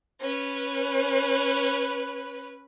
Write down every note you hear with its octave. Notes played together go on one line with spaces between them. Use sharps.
C#4 B4